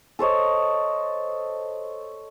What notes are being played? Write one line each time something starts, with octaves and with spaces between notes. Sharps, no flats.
A4 C5 C#5 D#5